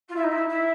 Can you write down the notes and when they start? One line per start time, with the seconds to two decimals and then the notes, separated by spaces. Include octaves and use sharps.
0.09 F4
0.16 E4
0.23 D#4
0.31 E4
0.48 E4